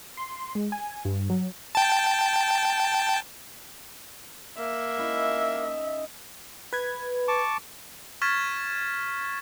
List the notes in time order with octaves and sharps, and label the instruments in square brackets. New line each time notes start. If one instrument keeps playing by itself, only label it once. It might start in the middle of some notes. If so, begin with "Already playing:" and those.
[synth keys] C6
G#3
G#5
G2
F#3
[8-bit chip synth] G5 A5
[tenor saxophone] A#3 [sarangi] E5
[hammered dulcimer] C#4 D#4 E4
D#5
[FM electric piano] B4 G#6
[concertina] A5 C#6 D6
[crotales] C#6 F6 G#6 A6 B6 E7